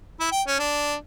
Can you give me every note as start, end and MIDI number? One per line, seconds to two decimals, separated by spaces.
0.20 0.28 64
0.32 0.42 79
0.47 0.58 61
0.60 0.95 62